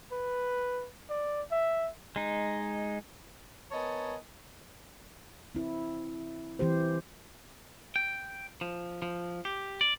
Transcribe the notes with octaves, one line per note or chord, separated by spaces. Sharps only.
B4
D5
E5
G#3 D#4
B3 A#4 C#5 D#5 G#5 A5
C4 E4
E3 C4 G4 C5
G5
F3
F3
G4
D5